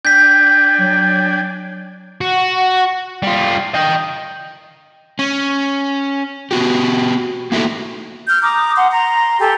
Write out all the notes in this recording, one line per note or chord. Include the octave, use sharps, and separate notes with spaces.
D4 G5 G#5 G6 B6
F#3
F#4
G3 F4
D#5 G5
C#4
B3 F#4 G4
A#3 D#4 E4 F#4 A4
F6 G6
A#5 D6 D#6
F#5 C6
A#5 C6
G4 A4 G#5 C6